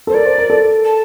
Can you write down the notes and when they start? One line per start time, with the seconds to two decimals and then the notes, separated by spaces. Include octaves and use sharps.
0.07 A4 C5
0.14 A#4 D5
0.26 C5
0.38 A#4
0.50 A4
0.84 A5